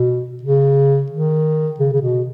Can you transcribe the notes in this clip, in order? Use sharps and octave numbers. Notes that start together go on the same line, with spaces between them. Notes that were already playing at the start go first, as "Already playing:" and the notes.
Already playing: B2
C#3
D#3
C#3
C#3
B2